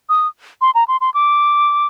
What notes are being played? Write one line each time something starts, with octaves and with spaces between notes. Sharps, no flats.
D#6
C6
A#5
C6
C6
D6